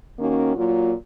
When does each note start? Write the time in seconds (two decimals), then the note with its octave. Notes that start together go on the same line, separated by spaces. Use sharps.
0.17 D#3 A#3 C#4 F#4
0.56 A#2 F#3 A#3 F4